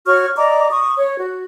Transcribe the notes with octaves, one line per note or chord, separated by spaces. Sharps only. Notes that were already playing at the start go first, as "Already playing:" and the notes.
F#4 C#5 C#6 F6
D5 D#5 A#5 D6
C#6 D#6
C#5
F#4